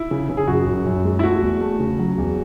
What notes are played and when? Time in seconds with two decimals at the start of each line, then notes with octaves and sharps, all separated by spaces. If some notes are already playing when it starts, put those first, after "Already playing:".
Already playing: E4
0.11 C#3
0.29 C#3
0.37 G#4
0.48 F#2 F#4
0.66 F#2
0.86 F#2
1.05 G#3
1.19 E4
1.24 A3 F#4
1.42 E2
1.61 A3
1.80 C#3
1.99 F#3
2.18 E2